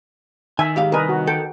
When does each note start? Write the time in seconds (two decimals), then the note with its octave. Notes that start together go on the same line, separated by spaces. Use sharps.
0.59 D#3 E5 G#5
0.76 G#2 G4 F5
0.92 C2 A#4 B4 D#5 G#5
1.09 F#4
1.27 A4 G5